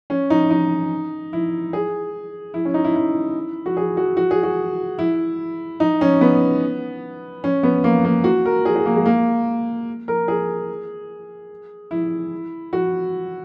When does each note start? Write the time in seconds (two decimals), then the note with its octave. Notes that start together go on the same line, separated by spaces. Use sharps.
0.10 C#4
0.30 D#4
0.51 D#4
1.33 E4
1.73 G#4
2.54 E4
2.65 C#4
2.74 D#4
2.84 E4
2.96 E4
3.66 F#4
3.77 G#4
3.97 F#4
4.17 F#4
4.31 G#4
4.43 F#4
4.99 E4
5.80 D#4
6.01 C#4
6.21 B3
7.44 C#4
7.63 B3
7.84 A#3
8.05 A#3
8.24 F#4
8.46 A#4
8.65 G#4
8.75 G#4
8.86 A#3
8.96 G#3
9.06 A#3
10.08 A#4
10.28 G#4
11.91 E4
12.73 F#4